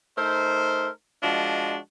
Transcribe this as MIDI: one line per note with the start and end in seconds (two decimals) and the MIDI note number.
0.18 0.89 57
0.18 0.89 63
0.18 0.89 70
0.18 0.89 72
1.23 1.78 53
1.23 1.78 56
1.23 1.78 62
1.23 1.78 66
1.23 1.78 75